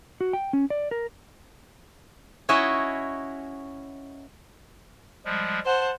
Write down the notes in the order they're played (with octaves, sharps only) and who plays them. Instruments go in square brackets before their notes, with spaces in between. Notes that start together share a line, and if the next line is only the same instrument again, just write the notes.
[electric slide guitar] F#4
G5
C#4
D5
A#4
[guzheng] C#4 E4 F#4 C#5 D#5 E5
[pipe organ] F3 G3 G#3
[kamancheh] C5 F#5 [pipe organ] A5